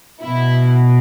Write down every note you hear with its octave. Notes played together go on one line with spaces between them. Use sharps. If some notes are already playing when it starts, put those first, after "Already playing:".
B2 E4